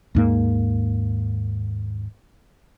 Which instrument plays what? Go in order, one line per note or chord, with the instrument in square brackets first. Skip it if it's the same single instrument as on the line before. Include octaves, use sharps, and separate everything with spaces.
[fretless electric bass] D#2 G#2 A#3